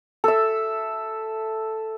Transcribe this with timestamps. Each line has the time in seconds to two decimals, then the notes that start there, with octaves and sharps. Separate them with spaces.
0.24 A4 E5